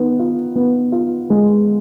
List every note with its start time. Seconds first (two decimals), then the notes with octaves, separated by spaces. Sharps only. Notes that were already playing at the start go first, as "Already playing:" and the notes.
Already playing: D#3 B3
0.19 F4
0.55 B3
0.92 F4
1.30 G#3